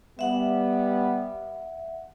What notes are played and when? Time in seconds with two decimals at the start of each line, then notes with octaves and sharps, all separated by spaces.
0.19 G3 B3 E5 F#5